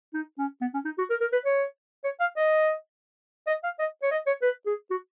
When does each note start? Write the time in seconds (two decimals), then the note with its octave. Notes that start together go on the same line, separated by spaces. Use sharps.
0.14 D#4
0.38 C#4
0.61 B3
0.74 C#4
0.85 D#4
0.98 F#4
1.10 A#4
1.21 A#4
1.33 B4
1.45 C#5
2.04 C#5
2.20 F5
2.37 D#5
3.47 D#5
3.64 F5
3.79 D#5
4.03 C#5
4.11 D#5
4.27 C#5
4.42 B4
4.66 G#4
4.91 F#4